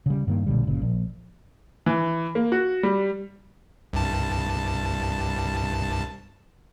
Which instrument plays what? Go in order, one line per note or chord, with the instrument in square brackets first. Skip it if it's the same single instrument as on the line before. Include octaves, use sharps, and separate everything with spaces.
[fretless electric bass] C#3 G3
G2 D#3 A#3
B1 A#2 D3 G3
G1 A#2 C#3
A#1
[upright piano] E3
A#3
F#4
G3
[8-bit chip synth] C2 G2 A5